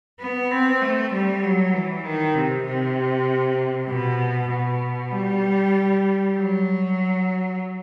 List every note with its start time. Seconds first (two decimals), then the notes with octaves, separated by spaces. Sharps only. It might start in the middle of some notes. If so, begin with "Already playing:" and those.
0.20 B3
0.51 C4
0.81 A3
1.11 G3
1.43 F#3
1.73 E3
2.04 D#3
2.34 C3
2.64 C3
3.87 B2
4.48 B2
5.10 G3
6.32 F#3